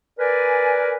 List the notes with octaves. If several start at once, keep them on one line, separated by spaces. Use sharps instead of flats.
A#4 B4 D5 G#5